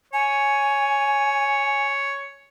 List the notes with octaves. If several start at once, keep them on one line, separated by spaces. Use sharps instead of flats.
C#5 G#5